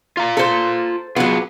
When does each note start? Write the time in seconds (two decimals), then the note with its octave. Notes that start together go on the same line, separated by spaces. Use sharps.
0.17 F4 F5 A#5
0.37 A4 C5
1.16 F#3 B3 F4 G#4